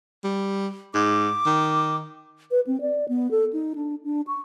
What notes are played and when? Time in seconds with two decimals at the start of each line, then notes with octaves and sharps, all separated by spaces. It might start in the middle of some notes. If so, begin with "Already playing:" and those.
0.24 G3
0.94 G#2 D6
1.46 D#3
2.51 B4
2.67 C4
2.81 D5
3.09 B3
3.31 A4
3.53 D#4
3.75 D4
4.04 D4
4.27 C#6